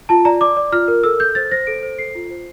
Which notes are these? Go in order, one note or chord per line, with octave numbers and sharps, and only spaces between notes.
F4 A5
D5 A#5
D5 D6
D5
F4 F6
A#4
A4 E6
A4 G6
C5 A6
C5 A#6
A4 D7
C5
A4 C7
F4
C5